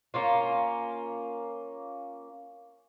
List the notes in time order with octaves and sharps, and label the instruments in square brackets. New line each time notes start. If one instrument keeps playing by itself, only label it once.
[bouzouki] A#3 C#4 F4